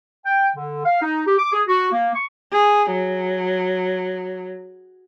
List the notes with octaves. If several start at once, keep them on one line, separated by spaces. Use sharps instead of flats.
G5
D3
F5
D#4
G4
D6
G#4
F#4
A#3
C#6
G#4
F#3